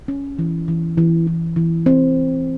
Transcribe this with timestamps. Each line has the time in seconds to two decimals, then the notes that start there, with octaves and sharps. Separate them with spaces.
0.08 C#4
0.39 E3
0.68 E3
0.98 E3
1.27 E3
1.56 E3
1.86 C4